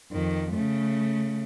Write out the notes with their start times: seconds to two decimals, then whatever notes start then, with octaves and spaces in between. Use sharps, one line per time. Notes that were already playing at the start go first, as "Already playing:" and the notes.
0.12 F2 D#3
0.54 C#3 A3